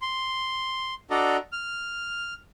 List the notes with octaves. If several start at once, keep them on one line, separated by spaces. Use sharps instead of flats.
C6
D4 F#4 A4 D5 D#5 A#5
F6